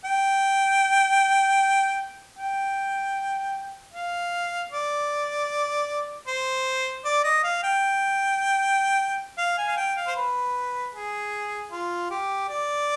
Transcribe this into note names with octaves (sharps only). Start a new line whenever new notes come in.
G5
G5
F5
D5
C5
D5
D#5
F5
G5
F5
G#5
F5
G5
F5
C5
B4
G#4
F4
G4
D5